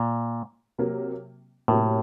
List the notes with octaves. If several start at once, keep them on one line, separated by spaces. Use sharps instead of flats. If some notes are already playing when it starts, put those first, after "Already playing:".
Already playing: A#2
C3 F#3 A#3
A2 C3 F#3 A#3